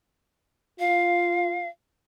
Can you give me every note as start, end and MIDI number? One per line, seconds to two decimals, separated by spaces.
0.79 1.66 65
0.79 1.68 77